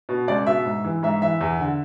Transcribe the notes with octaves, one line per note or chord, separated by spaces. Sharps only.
B2
C#2 D5
B2 E5
G#2
E3
G#2 E5
E3 E5
E2
D3